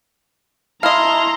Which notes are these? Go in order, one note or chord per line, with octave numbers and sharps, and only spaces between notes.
E4 D#5 F5 A5 A#5 C6